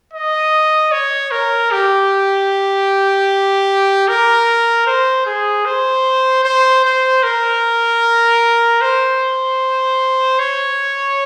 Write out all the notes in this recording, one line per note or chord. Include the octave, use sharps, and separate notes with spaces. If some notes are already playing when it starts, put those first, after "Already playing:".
D#5
C#5
A#4
G4
A#4
C5
G#4
C5
C5
C5
A#4
C5
C#5